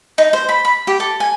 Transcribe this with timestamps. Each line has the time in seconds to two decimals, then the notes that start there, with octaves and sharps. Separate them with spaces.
0.18 D#4
0.33 C5
0.49 B5
0.65 B5
0.87 G4
1.00 A4
1.20 G#5